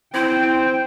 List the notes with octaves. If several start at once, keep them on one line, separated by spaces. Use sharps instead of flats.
C4 E4 G5